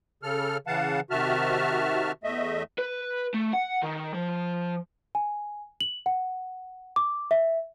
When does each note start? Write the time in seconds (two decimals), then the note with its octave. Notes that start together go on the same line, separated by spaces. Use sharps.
0.23 C#3 A4 F6
0.67 C#3 E3 F5 F#5 A5
1.11 C3 D#3 F#4 E5 A5 F6
2.24 E2 A3 D#5 E5
2.79 B4
3.34 A3
3.53 F#5
3.83 D#3
4.14 F3
5.15 G#5
5.81 F#7
6.06 F#5
6.96 D6
7.31 E5